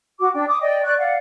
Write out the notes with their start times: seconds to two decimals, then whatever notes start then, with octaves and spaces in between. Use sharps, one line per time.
0.19 F#4 D6
0.34 D4 G5
0.47 D6 D#6
0.60 D5 D#5 G5
0.84 D5 C#6 F#6
0.98 D5 F5 F#5